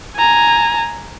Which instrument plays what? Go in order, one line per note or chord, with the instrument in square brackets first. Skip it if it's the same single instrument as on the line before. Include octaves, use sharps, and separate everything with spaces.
[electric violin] G#5 A#5